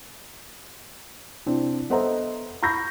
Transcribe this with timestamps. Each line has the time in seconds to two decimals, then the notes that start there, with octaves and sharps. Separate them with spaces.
1.46 C3 C4 D4 E4
1.90 B3 A4 C5 D#5 E5 A#5
2.63 A#5 B5 C#6 G6 A#6